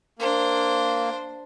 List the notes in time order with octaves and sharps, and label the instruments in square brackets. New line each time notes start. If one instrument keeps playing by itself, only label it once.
[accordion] A#3 [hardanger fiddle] D4 C5